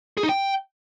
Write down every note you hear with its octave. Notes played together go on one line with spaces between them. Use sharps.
G#4
D#4
G5